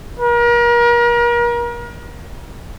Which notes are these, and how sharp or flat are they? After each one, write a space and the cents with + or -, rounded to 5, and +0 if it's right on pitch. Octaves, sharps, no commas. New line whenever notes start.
A#4 +35